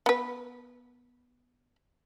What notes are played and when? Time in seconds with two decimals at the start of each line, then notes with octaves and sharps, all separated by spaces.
0.06 B3 B4